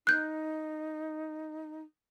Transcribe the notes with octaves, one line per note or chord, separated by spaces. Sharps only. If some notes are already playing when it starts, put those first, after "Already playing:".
D#4 F#6 G6